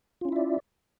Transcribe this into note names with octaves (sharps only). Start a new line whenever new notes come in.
C#4 E4 F4 D5 E5